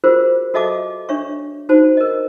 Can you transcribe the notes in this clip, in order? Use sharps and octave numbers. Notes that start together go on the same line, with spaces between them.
F4 F#4 G#4 A#4 C5
F#4 A4 D#5 E5 A5 D6
D4 C#5 E5 C#6
D#4 F#4 C5 A5
A#4 D#5